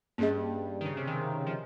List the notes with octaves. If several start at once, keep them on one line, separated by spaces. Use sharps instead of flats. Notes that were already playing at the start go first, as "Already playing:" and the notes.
G2 A#3 C#4 G#4 D#5
D#3
C#3
C3
D#3
F3